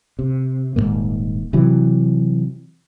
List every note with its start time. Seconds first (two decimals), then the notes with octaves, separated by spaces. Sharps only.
0.19 C3
0.76 D#1 E2 G#2 A#3
1.53 C3 E3 F#3